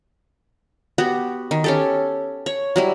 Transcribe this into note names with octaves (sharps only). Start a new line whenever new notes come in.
B3 F#4 G4
D#3
C#4 G4 A4
C#5
F#3 G3 E4